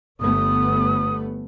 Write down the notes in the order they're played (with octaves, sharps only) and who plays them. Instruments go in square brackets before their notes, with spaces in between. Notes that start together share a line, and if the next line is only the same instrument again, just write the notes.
[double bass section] G1 A3 B3 [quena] D#6